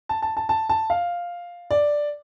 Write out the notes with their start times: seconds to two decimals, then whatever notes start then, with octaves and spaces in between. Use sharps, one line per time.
0.09 A5
0.22 A5
0.37 A5
0.49 A5
0.69 A5
0.90 F5
1.71 D5